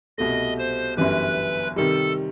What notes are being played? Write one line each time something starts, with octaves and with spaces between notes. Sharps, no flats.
C2 B2 A3 D#5
C5
G1 F#2 E3 G3 B4
C3 D#3 G3 A4